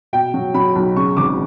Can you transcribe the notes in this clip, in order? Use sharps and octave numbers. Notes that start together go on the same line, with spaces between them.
B2 G5
F#3
F#3 B5
B1
C#3 C#6
G#1 D6